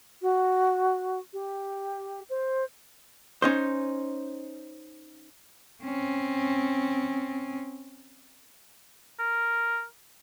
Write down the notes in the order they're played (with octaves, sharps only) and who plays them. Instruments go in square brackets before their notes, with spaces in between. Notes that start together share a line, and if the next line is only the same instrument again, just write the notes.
[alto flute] F#4
G4
C5
[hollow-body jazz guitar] C#4 D#4 C5
[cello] C4 C#4
[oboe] A#4